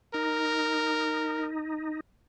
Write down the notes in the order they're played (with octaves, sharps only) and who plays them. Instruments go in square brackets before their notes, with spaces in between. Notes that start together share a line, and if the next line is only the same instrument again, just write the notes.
[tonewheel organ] D#4 [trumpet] A#4